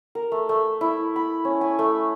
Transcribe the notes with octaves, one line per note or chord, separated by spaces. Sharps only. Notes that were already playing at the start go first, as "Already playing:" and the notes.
A#4
A3
A3
E4
B5
C#4
G#5
A3